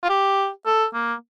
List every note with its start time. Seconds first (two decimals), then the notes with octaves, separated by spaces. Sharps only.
0.04 F4
0.09 G4
0.66 A4
0.94 A#3